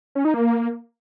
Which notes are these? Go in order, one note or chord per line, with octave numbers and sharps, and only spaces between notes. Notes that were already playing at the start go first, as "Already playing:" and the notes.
C#4
D#4
A#3